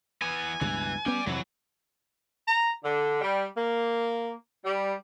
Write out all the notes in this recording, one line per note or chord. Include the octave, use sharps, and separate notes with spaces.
E3 B3 G#5
C#2 G2 B2 E3
B3 C#4 D5 G5
F2 C3 E3 F#3
A#5
D3
G3
A#3
G3